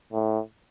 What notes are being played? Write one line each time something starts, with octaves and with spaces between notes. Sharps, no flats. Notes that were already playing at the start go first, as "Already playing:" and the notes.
A2